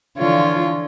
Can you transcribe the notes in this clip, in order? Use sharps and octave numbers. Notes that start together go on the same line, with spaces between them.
D3 E3 F3 F4 C#5